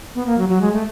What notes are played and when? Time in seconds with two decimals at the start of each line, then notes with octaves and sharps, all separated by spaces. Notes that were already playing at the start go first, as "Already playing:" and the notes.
0.15 B3
0.27 A#3
0.38 F#3
0.49 F#3
0.61 G#3
0.73 A3